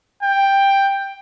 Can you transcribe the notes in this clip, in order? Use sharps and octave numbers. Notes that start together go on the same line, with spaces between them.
G5